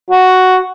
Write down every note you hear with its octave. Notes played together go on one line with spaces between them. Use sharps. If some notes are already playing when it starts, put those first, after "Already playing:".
F#4